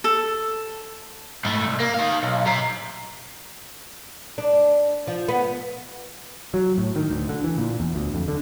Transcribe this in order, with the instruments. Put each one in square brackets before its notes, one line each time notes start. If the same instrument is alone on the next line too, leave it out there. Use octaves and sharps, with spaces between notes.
[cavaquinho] A4
[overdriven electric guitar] G#2 A3
C2
A#3
D#4 F5
B1
C5 A#5
[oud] D4
F3
B3
[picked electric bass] F#3
A2
D#3
D2
D3
E3
A#2
E2
D2
F2
D3